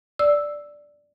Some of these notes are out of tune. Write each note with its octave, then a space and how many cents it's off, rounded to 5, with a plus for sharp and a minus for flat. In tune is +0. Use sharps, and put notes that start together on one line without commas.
D5 +0 E6 +0